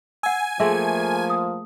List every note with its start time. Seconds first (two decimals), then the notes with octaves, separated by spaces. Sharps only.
0.23 F#5 G#5 E6
0.60 F3 A3 A#3 G#4 E5 C6
1.30 D#6